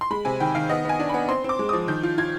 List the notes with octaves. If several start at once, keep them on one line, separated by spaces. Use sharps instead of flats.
C6
G#3 B5
C3 G#5
D#3 G5
D#3 F5
B3 D#5
B3 G#5
D4
B3 B5
C4 C6
C4 D6
G#3
F3 D#6
D#3 G6
F4
F4 G#6